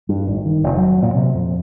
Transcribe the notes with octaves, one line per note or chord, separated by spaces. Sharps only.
G2
G#1
D#3
F1
F#3
A#2
C3
F2